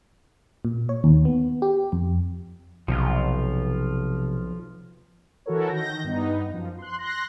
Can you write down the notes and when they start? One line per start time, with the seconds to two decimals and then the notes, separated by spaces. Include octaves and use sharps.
0.65 A#2
0.89 C#5
1.04 D#2
1.25 B3
1.62 G4
1.92 F2
2.88 B1 C3 F3 F4
5.46 E3 E4 F#4 A4 A#4 C#5
5.69 D#3 G6 A#6
6.04 G2 B3 D#4
6.50 F#2 F3
6.78 C6 F#6
6.99 C6 F#6 A#6